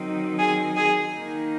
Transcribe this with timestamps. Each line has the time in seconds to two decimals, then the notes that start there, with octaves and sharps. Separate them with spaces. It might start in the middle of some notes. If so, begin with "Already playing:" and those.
Already playing: D#3 F#3 C4 D#4
0.38 G#4 G#5
0.76 G#4 G#5
1.13 D#3 A#3 D#4